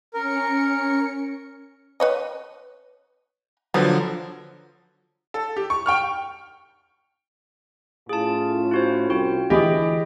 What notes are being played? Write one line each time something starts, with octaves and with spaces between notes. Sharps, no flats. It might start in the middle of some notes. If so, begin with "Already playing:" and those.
C#4 A#4 C#7
B4 C#5 D#5
D3 F3 F#3 B3
A4
G4
C#6
G5 C#6 F6
A2 C#4 F4 G#4 A5
E4 F#4 C5
C2 F#4 G5
D2 E3 G4 G#4 D#5